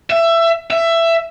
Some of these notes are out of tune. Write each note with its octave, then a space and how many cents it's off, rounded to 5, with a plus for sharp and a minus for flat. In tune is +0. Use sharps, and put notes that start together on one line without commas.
E5 +20
E5 +15